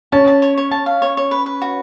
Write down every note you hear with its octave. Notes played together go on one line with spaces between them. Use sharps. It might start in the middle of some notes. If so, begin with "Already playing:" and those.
C#4 A5
A5
C#5
C#5
A5
F5
C#5
C#5
B4
B4
F#4